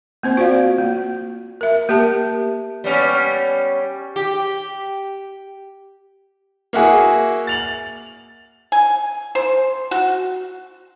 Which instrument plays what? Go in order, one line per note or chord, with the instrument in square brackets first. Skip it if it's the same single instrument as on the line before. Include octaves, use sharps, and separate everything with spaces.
[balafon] A#3 C4 C5
F4 F#4 C5 D5 F5
A#3
A#4 E5
A#3 G4 A#4 E5 A5
[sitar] G3 B3 C#4
G4
[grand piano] A#3 E4 F#4 G#4
A6 F7 F#7
[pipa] G#5
C5
F#4